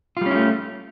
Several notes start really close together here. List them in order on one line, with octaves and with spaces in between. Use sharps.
F4 G3 C#4 E4 A3